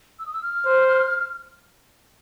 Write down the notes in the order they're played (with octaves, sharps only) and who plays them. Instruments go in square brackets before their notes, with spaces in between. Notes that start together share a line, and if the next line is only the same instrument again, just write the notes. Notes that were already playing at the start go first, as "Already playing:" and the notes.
[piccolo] E6
D#6
E6
F6
[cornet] C5